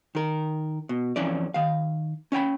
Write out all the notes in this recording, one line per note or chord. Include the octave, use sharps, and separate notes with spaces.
D#3 A#4
B2
F2 E3 C#4 D5
D#3 F5
C#4 C#5 G5 B5